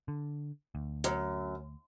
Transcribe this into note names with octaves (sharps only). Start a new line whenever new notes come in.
D3
D2
F#2